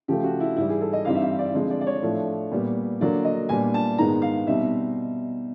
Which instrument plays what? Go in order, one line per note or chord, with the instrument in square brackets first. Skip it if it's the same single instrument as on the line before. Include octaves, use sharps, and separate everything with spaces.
[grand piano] C#3 F3 A3 G4
F#4
E4
G#2 E3 G3 E4
G#4
A4
D#5
G2 E3 G3 C4 D#4 F5
E5
F5
D5
D3 F3 G#3 C4
D5
D5
C#5
A2 F3 A3 D4
A#2 G3 B3
D3 F#3 A#3 D5
D#5
A#2 G3 B3 D4 G#5
A5
G#2 D#3 G#3 B3 A#5
F5
B2 G3 C4 D#4 E5